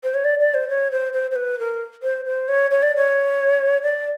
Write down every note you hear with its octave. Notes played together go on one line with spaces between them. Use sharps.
C5
C#5
D5
D5
C5
C#5
C5
C5
C5
B4
A#4
C5
C5
C#5
C#5
D5
C#5
D5